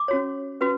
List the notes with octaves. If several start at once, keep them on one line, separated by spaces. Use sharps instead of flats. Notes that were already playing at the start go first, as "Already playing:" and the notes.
Already playing: D6
C#4 F#4 C#5
C#4 F#4 B4